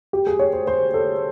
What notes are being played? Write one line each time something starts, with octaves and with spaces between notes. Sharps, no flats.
G4
G#4
C#5
C5
C5
A4